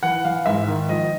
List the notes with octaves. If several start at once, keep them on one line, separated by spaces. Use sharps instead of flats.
E3 F#5
E3 F5
G#2 E5
D#3
F3 D#5